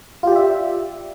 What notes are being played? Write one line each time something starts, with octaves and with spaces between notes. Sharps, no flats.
F4 G4 D5 E5